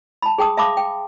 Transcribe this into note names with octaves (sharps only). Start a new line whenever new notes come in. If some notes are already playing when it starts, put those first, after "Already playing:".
A5 B5
G#4 G5 A5 D#6
E5 F5 A5 B5 D6 D#6
G5